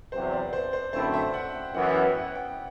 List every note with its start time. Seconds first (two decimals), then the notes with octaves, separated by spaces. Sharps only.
0.12 E2 C3 F#3 C5
0.33 D5
0.53 C5
0.73 C5
0.93 F#2 D3 A3 C4 E4 C5
1.13 E5
1.34 F#5
1.54 G5
1.74 F#2 E3 B3 E4 F#5
1.87 F#5
1.95 G5
2.15 F#5
2.35 G5